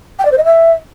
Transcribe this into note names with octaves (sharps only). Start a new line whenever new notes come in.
G5
D5
C5
D#5
E5